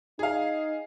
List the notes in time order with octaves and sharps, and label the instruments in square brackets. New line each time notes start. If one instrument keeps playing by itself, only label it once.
[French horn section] D#4 [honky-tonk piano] G#4 F5